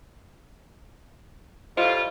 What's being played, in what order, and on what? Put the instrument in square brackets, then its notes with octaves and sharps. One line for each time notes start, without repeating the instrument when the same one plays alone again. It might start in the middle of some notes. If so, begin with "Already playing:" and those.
[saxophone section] A2 G3 F4 [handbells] C5 D#5